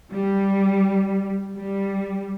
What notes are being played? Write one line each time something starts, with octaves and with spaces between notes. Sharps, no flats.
G3
G3